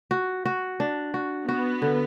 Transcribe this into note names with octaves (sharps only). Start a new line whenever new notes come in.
F#4
F#4
D4
F#4
B3 F#4
D3